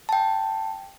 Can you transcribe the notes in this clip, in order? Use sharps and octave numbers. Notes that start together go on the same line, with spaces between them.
G5 A5